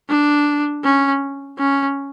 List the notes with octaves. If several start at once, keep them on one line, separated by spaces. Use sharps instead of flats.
D4
C#4
C#4